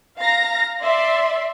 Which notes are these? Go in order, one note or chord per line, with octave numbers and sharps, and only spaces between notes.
F5 A#5 A#6
D5 E5 C6